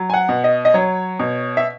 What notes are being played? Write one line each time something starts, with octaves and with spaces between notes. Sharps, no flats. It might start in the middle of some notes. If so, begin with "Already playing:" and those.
Already playing: F#3
G#5
F#5
B2
D#5
D#5
F#3 C#5
B2
E5